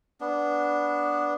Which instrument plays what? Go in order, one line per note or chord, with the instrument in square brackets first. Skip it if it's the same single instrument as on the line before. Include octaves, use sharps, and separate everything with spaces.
[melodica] B3 D4